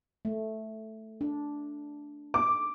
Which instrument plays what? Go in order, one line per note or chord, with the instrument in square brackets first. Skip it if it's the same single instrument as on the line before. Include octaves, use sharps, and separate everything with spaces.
[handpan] A3
D4
[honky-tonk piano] D6